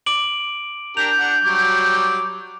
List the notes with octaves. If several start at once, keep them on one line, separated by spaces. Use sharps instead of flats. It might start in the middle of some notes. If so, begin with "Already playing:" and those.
D6 D7 F#7
D4 G4 A#4 G6 F7
D4 F#5
F#3 G3 D6